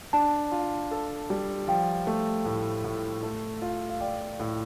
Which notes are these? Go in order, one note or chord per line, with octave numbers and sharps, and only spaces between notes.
D4 A5
F4
A4
G3
F3 G5
A3
A2
A2
A3
F4
F5
D5 G5
A2